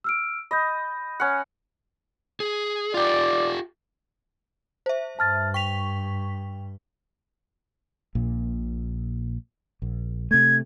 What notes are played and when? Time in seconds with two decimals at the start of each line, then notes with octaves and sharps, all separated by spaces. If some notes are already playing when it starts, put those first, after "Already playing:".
0.04 E6 F6 D7
0.51 D#5 B5 G6
1.20 C#4 F#5
2.40 G#4
2.94 F4 G4 D5
4.86 C5 E5
5.19 G2 A5 F6 A6
5.54 G5 C#6 B6 F7
8.15 A#1 A#2
9.82 A#1
10.31 C3 A3 G#6